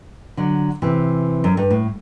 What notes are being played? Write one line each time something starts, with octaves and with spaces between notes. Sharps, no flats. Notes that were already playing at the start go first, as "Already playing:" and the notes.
D3 F#3
C3 E3
F#2
G2
A2